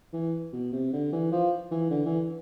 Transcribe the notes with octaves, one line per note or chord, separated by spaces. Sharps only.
E3
B2
C3
D3
E3
F3
E3
D3
E3